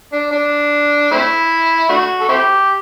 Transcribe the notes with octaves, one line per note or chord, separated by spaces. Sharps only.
D4
D4
A3 C4 E4
A3 D4 F#4
A4
C4 E4 G4